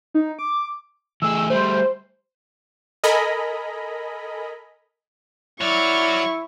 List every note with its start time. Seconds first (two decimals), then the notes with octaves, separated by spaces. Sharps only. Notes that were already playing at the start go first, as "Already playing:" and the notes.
0.14 D#4
0.39 D6
1.22 E3 A3 G#4 E6
1.50 G3 A3 C5
3.04 A4 A#4 D#5 G#5 A#5 B5
5.61 F#3 E4 D5 C#6 F6